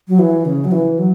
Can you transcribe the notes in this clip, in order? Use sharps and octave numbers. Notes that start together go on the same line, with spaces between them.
F#3
E3
C#3
F#3
E3
F#3